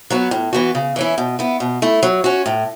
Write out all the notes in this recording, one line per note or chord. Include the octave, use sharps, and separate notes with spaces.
F#3 B3 F#4
A2
E3 B3 F#4
C#3
E3 C#4 E4
B2
B3 E4
B2
A3 E4
F#3
C#4 F#4
A2